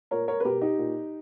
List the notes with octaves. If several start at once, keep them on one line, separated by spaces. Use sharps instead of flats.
A#2 A#4 C#5
A#4 C#5
B4
B2 G4 A#4
D#4 G4
A#2